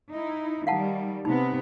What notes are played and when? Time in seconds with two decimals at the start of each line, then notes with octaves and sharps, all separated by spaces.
0.12 D#4 E4
0.67 D#3 G3 F5 F#5 A5
1.25 C3 B3 D#4